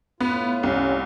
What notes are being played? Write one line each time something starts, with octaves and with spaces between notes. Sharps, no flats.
A2 B3 F4
C2 C#4